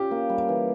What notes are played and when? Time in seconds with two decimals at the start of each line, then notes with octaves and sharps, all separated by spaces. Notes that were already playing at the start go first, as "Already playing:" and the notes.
Already playing: C#4 F4 G4
0.11 A#3
0.30 G3
0.49 E3